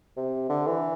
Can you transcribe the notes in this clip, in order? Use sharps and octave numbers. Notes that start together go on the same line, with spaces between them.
C3
D3
E3